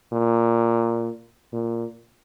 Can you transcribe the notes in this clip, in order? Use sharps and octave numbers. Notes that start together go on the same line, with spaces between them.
A#2
A#2